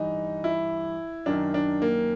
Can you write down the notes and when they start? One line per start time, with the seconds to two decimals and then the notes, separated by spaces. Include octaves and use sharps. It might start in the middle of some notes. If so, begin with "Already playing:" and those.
Already playing: G2 E3 D#4
0.44 E4
1.26 F#2 D#3 D4
1.54 D4
1.82 A#3